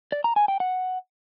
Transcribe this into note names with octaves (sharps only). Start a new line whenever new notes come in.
D5
A#5
G#5
G5
F#5